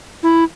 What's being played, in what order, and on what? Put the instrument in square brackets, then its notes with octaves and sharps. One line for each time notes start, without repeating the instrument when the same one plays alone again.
[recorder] E4